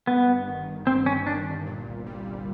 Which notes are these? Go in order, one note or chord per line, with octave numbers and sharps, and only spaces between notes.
G2 B3
G1
D#3
G1
G2 C4
G1 C#4
D#3 D4
G1
A#2
C2
G3
C2